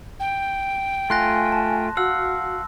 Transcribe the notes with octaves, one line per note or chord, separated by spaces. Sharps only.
G5
A3 F4 G#5 C6 F#6 A#6
A5
F#4 F5 F#5 E6